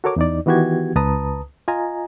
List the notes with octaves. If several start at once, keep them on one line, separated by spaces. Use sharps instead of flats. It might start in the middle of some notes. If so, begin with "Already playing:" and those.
F#4 A4 A#4 C#5 D6
E2 D#4 D5
D#3 E3 B3 F#4 G4 G#6
C#2 B4 A5 A#5 D#6
F4 D#5 G#5 A#5